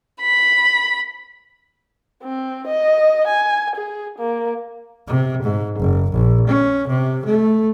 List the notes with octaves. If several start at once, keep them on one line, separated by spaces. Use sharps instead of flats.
B5
C4
D#5
G#5
G#4
A#3
C3
G#2
F#1
A#1
C#4
C3
A3